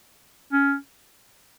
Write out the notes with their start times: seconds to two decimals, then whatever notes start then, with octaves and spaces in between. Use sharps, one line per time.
0.53 C#4